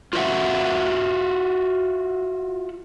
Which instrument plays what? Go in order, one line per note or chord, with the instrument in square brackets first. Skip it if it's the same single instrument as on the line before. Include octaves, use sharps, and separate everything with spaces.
[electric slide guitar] F4 F#4 C5 D#5 E5 F#5